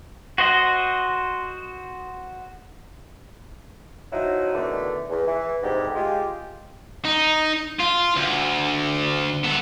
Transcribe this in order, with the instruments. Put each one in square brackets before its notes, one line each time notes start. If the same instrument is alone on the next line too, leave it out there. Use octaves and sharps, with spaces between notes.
[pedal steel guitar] F#4 C5 D#5
[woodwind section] F3 F#3 D#4 E4 F#4
E2 B2 D3 D#3 A3
E2
E3
D2 G#2 C3 G3 A3 G4
G#3 F4 G4
[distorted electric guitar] D#4
F4
D2
B3 A4